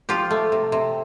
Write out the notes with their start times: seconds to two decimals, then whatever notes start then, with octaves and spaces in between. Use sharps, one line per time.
0.09 F3 F4 G4
0.31 A3
0.52 C3
0.72 C3